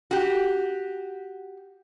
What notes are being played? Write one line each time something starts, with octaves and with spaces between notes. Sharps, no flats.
F#4 G4